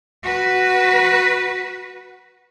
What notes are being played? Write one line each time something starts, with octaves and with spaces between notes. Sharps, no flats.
F#4 B4